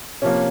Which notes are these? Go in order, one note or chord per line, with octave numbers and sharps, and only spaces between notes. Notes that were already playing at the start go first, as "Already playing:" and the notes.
C3 F3 A#3 C#4